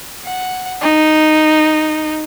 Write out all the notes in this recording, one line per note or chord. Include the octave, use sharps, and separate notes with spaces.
F#5
D#4